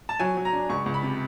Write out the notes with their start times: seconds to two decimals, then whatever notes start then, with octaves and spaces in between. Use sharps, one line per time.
0.09 A5
0.20 F#3 G#5
0.37 F#3
0.45 A#5
0.53 D4
0.69 C#2 C#6
0.86 C#2
0.94 B5
1.03 C3